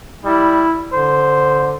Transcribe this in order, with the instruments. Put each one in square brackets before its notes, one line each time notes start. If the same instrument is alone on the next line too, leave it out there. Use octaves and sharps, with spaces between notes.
[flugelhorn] G3 [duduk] E4
[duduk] D3 [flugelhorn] C5